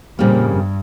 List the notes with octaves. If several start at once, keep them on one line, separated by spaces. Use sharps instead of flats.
F2 A#2 C#3 G3 A#3
G2